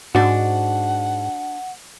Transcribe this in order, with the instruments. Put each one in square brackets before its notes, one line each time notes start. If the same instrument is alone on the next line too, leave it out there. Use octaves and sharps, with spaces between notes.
[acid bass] G#2 [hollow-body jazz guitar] D4 F#4 [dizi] F#5